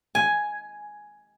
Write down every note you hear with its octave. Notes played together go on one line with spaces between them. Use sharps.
G#5